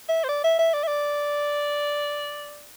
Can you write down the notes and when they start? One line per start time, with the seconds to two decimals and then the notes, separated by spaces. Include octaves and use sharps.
0.09 E5
0.24 C5
0.28 D5
0.44 E5
0.58 E5
0.73 D5
0.83 E5
0.87 D5